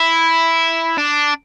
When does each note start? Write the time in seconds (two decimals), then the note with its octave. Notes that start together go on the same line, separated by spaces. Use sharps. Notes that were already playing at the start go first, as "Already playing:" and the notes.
Already playing: E4
0.98 D4